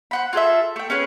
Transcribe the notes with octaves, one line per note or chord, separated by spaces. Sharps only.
C5 F#5 B5
F4 G#4 A4 E5
A3 G5
C#4 G#4 B4 C#5